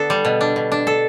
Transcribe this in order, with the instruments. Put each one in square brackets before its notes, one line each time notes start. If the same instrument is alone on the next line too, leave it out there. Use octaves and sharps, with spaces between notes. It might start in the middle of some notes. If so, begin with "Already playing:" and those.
Already playing: [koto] D3 B3 D4 A4
G3
B2
D4
B2
D4
A4